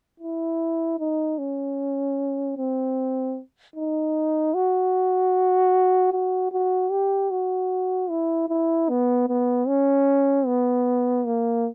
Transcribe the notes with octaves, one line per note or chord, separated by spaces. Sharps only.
E4
D#4
C#4
C4
D#4
F#4
F#4
F#4
G4
F#4
E4
E4
B3
B3
C#4
B3
A#3